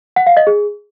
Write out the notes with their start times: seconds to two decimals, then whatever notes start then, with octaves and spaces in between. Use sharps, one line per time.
0.16 F#5
0.27 F5
0.37 D#5
0.47 G#4